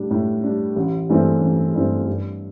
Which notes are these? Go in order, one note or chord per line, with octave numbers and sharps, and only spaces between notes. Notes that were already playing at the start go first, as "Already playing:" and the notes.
Already playing: A2 G3 D4
A2
G3 D4
A1
G2 E3 A3 C4
A1
G2 E3 A3 C4
G2